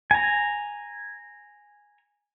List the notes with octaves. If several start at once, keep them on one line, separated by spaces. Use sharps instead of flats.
G#5 A#5